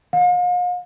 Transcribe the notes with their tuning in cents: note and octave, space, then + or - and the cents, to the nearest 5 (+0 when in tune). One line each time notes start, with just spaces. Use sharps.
F5 +40